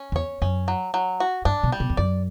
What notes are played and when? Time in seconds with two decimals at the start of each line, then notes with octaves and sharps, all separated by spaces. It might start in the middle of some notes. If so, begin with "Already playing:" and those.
Already playing: C#4
0.12 E2 C#5
0.42 F#2 C#4
0.68 F#3
0.94 F#3
1.20 F#4
1.45 G2 D4
1.63 B2
1.72 G3
1.80 B2
1.90 E2
1.97 F#2 D5